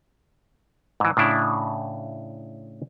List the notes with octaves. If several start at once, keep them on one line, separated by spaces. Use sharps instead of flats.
G#2 E3
A2 C#3 D4 E4